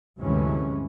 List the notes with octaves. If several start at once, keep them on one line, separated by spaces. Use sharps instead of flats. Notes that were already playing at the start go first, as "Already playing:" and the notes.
D2 G2 C3 E3 G#3 C#4